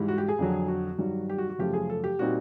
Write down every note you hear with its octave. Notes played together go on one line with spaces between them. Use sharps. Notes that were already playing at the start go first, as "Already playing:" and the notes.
Already playing: G#2 E3 G3
F#4
G4
G#4
F2 D3 F#3
F#4
G2 D#3 F#3
G4
F#4
F#4
F#2 C#3 F3 A3 G4
G#4
A4
G4
A#2 G3 C4 D#4 F#4